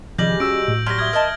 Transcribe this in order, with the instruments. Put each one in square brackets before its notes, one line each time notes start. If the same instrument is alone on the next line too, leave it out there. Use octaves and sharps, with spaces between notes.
[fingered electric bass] C3 D#3 F3 [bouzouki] G3 G#3 [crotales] G6 A#6 F#7
[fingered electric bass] C#4 [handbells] F#4 E6 [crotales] D7
[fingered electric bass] A2
[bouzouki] F#3 G3 [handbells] C6 B6 [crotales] F6 A#6
[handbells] E5 D#6 F6 [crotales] G#6 G7
[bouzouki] A#4 D#5 A5